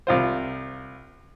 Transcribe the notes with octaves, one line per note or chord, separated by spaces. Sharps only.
C2 F4 C5